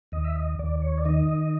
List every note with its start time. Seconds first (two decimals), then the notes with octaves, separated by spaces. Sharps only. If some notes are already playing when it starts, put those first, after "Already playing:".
0.12 D#2 D#5
0.24 E5
0.36 D#5
0.59 D#2 D5
0.82 C#5
0.98 D5
1.05 D#3 D#5